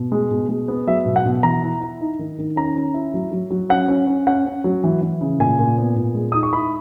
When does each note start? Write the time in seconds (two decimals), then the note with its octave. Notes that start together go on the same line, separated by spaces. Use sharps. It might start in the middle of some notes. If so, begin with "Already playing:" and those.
Already playing: B2
0.12 G#3
0.31 B2
0.49 G#3
0.68 B3
0.87 F#3 E5
1.06 B2
1.16 F#5
1.25 B2
1.43 E3 A#5
1.63 E4
1.81 E4
2.01 D#4
2.19 D#3
2.38 D#3
2.56 C#4 A#5
2.76 C#4
2.94 E4
3.14 F#3
3.32 F#3
3.50 F#3
3.69 C#4 F#5
3.88 C#4
4.07 C#4
4.27 C#4 F#5
4.45 C#4
4.64 F#3
4.84 E3
5.01 E3
5.21 C#3
5.39 A#2 G#5
5.59 A#2
5.78 B3
5.96 A#2
6.15 G#3
6.32 D#4 D#6
6.43 C#6
6.53 E4 B5